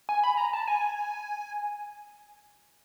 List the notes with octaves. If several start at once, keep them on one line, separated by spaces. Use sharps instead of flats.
G#5
B5
A#5
A5
G#5